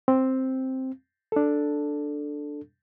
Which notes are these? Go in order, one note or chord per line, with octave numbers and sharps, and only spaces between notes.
C4
D4 A4